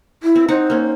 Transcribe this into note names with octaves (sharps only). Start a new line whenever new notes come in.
E4
C4
D#4 C5 F#5
A#3 C#4